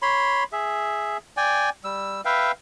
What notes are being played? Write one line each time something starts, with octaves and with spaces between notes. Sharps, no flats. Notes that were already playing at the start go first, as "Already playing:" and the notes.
C#5 B5 C6
G#4 E5
D5 G5 G#5
G3 E6
B4 E5 F5 G5